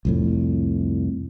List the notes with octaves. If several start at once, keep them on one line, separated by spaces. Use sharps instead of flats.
C2 F2 A2